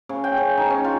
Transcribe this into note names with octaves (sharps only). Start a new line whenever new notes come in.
C#3
G5
C#3
D#4
C#4
F4